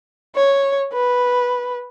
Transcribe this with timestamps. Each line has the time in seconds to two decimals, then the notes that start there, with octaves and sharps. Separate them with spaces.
0.36 C#5
0.93 B4